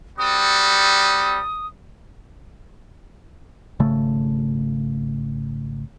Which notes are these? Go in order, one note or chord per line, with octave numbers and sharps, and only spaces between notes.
G3 C4 F#4 A4 D#6
G#1 C#3 A3